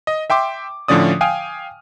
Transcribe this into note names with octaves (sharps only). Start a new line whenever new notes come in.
D#5
E5 G5 C6 D6
A2 D3 F3 C#4 D5 D#6
F5 G5 G#5 D#6 F6